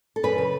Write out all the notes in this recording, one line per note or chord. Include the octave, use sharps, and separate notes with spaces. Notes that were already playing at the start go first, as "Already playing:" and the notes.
A4
F#2 B4
C#3